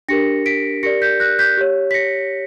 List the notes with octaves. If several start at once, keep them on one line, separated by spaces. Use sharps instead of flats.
D4 G4 A#4 A#6 C#7
B6 D7
G4 A#4 D5 A#6 C#7
G6 B6
F#6 A#6
G6 B6
G4 C#5
B6
A#6 C#7